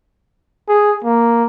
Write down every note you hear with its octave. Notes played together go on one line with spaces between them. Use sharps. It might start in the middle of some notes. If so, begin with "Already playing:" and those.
G#4
A#3